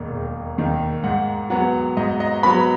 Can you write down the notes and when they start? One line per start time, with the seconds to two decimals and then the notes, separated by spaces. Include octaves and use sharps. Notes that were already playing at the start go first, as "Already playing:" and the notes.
Already playing: E1 D#2 D#3
0.12 E1
0.58 D#2 D#3
1.04 G#2 F#5
1.50 F#3 B3 F#5
1.97 G#2 D#5
2.20 D#5
2.43 F#3 B3 B5